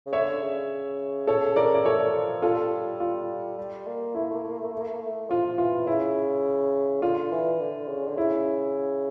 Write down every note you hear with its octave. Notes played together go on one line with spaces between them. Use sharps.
C#3
D3 C#5 E5
C#3
A4 C#5
A#4 D5
D5
A3 A4 C#5
F3
G3 F4 A4
F4
G3
A#3
A3 E4
A#3
A3
A#3
A3
A#3
A3
A#3
A3
A#3
A3
A#3
A3
F3 F4
E3 F4
C#3 E4
D3 F4
E3
D3
C#3
D3
C#3 E4